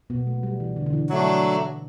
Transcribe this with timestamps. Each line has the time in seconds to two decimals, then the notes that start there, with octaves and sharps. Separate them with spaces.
0.10 B2 B3
0.27 A3
0.43 G3
0.60 E3
0.76 D3
0.86 D3
0.93 E3
1.09 F#3 A3 D4